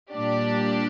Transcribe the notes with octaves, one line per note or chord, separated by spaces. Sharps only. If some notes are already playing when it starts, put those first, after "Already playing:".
A#2 G3 D4 G4 D5